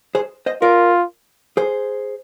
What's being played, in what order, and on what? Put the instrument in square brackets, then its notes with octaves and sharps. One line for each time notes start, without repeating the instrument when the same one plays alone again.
[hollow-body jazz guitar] G#4 C5
C5 D#5
[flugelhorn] F4 [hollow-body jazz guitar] A#4 D5
[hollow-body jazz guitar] G#4 C5